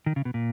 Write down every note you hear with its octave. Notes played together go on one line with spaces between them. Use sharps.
D#3
C#3
B2
A#2